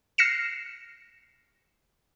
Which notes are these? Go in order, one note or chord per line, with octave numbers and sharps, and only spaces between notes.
F6 A#6 C7 C#7 E7